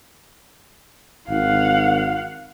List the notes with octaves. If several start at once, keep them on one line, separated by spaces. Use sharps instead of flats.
G#1 F5 F#5